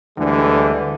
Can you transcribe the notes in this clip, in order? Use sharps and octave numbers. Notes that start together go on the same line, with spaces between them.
D2 D3 E3 G3 G#3